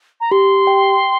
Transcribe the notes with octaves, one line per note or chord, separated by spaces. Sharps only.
A#5
G4 C6
G5